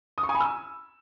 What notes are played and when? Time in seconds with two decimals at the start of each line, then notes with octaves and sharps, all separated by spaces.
0.18 D#6
0.23 C#6
0.29 G#5
0.35 B5
0.40 E6